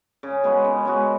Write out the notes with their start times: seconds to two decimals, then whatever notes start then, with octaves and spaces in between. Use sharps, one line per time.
0.23 C#3
0.44 G#3 B3 F#4
0.64 C#3
0.85 G#3 B3 F#4